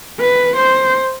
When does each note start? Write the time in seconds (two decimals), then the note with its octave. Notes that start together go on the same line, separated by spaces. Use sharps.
0.20 B4
0.56 C5